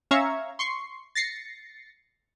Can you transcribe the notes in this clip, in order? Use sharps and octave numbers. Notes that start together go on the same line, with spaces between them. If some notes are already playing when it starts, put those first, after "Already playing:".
C#4 E5 F5 A#5 C#6 G#6
C6 C#6 C7
A6 A#6 C7 C#7